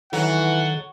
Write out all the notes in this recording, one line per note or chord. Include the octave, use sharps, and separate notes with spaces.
D#3 E3 F#3 A4 F#5